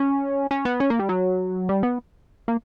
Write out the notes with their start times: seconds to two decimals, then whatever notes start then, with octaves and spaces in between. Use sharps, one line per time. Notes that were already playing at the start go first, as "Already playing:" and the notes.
Already playing: C#4
0.51 C#4
0.65 B3
0.80 C#4
0.90 A#3
0.99 G3
1.09 F#3
1.69 G3
1.83 B3
2.48 A#3